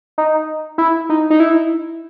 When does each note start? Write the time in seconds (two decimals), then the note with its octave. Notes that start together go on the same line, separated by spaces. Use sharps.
0.18 D#4
0.78 E4
1.10 D#4
1.30 D#4
1.40 E4